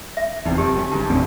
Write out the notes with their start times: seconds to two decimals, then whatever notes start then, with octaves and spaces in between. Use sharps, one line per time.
0.17 E5
0.45 F1 E2 C4 D#4
0.58 F#2 G4
0.75 D3 B3 C#4
0.92 G#1 G2 C#4 A5
1.10 D#1 D#2 A2 D3 C4